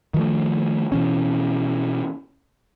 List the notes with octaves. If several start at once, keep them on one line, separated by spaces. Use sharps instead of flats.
D#3 F3 A3
B2 E3 C#4